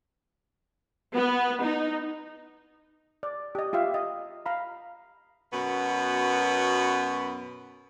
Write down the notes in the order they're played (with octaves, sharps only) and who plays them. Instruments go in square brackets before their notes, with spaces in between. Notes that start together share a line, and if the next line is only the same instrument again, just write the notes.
[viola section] B3
D#4
[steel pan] D5
G4 D#5
F4 G4 E5 F5
D#5
F5 A#5 B5
[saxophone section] F#2 B2 B3